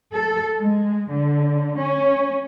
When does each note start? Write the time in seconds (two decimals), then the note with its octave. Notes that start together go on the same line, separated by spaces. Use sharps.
0.13 A4
0.58 G#3
1.11 D3
1.79 C#4